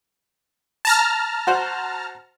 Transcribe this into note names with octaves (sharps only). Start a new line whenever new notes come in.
A5 A#5 F6
F#4 C5 F#5